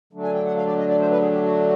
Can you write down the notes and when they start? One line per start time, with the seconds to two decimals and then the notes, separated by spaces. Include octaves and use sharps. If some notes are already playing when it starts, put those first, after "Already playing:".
0.13 D3 F#3 A3 D4
0.23 G#5
0.34 G5
0.45 F#5
0.56 F5
0.66 D5
0.77 D#5
0.88 D5
0.99 C5
1.11 B4
1.21 G#4
1.32 G4
1.42 F#4